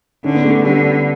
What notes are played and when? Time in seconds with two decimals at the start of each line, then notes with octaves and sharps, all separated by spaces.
0.24 D3 C#4
0.35 B3
0.44 A3
0.63 D3 G3